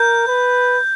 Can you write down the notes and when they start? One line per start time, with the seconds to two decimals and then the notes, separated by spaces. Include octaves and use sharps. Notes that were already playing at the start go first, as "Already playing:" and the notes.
Already playing: A#4 G6
0.27 B4